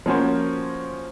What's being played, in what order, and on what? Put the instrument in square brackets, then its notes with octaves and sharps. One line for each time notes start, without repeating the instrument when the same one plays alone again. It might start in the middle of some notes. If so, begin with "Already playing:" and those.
[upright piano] F3 A#3 C#4 F#4 C5